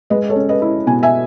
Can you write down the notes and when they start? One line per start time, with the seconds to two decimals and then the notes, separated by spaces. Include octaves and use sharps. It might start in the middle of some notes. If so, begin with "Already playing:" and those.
0.10 G#3 B4 D#5
0.29 A4 C#5
0.36 C#4
0.49 B4 D#5
0.62 E4
0.87 B2 G#5
1.03 E5 G#5